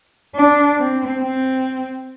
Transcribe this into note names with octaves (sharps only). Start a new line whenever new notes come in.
D4
C4
C4